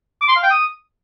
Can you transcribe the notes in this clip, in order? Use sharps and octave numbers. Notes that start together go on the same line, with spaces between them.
D6
C6
F5
G5
D#6